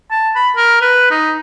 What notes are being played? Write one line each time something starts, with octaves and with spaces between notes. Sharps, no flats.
A5
B5
A#4
B4
D#4